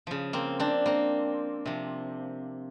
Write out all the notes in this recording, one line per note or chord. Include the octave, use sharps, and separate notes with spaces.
C#3 F3
A#3 C4
C4 D4
A#3 C4
C3 F3